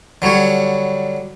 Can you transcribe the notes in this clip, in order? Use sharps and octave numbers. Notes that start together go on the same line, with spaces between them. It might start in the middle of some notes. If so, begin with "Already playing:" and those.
D3 F#3 G3 C#5